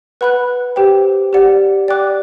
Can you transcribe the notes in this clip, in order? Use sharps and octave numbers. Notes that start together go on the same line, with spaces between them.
B4 F#5 B5 F#6
G4 C5 G5
G4 D5 F#5
D5 G5 D6 F#6